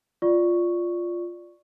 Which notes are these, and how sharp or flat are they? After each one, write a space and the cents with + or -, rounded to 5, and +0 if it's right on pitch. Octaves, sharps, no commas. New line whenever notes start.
F4 +0 D5 +0 C#6 +0